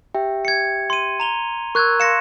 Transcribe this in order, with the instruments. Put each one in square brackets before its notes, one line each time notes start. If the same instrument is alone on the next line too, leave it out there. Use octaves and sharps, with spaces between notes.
[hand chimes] G4 E5 G5
[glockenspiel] G#6 C#7
C6 D#7
A#5 F7 G7
[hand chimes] A#4 E6 [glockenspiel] C#6 F#6 G#6
[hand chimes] F5 C6 [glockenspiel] A#6 C#7 E7